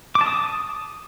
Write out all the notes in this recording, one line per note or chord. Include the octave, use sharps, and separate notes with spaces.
D6
A5
D#6